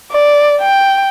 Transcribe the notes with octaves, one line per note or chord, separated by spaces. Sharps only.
D5
G5